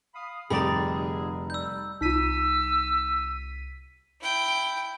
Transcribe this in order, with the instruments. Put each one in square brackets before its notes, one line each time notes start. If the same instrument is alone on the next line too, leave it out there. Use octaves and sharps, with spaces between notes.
[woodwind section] F5 B5 D#6
[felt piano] F1 [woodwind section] D3 G#4 [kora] G3 D#4 D5 [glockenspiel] A#5 B5
[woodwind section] G3 [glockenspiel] E6 G6
[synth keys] C2 B6 D#7 [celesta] D#4 F4 [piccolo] E6
[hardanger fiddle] E4 G5